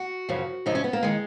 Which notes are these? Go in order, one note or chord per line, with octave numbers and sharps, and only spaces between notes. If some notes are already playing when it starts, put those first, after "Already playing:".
Already playing: F#4
F#2 C#3 F3
F#2 C#3 F3 D#4
C#4
B3
A#3
D#3 G#3